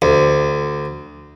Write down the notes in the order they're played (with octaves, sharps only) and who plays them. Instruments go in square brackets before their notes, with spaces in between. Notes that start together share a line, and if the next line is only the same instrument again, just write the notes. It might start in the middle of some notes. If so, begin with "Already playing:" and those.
[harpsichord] D2